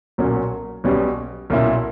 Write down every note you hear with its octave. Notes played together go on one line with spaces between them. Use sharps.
B1 A#2 F#3 A#3 C#4
B1 B2 G3 C#4
B1 A#2 A#3 C#4 E4